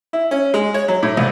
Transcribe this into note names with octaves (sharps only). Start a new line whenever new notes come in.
E4
C#4
G#3
C#5
F#3
A2
C2